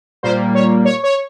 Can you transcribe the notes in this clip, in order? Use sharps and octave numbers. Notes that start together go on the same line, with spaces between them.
A#2 G3 A#3 C5
C#5
C#5
C#5